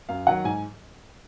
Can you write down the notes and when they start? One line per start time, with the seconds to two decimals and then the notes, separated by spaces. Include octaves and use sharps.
0.09 F#2 F5
0.27 D#3 F#3 F#5
0.45 G#2 G#5